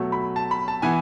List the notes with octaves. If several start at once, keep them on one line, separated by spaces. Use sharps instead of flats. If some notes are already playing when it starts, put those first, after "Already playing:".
Already playing: B2 F#3 A3
B5
A5
B5
A5
E3 B3 G#5